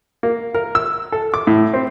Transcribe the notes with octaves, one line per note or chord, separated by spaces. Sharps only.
A#3
A#4
E6
A4
D6
A2
C4